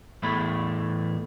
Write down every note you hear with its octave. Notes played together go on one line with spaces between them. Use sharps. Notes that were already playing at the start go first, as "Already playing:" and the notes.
E2 A2 E3 A3 B5